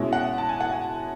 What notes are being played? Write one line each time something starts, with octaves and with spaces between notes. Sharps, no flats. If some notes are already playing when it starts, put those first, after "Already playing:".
Already playing: B2 G#3 C#4 E4
F#5
A5
G#5
F#5
G#5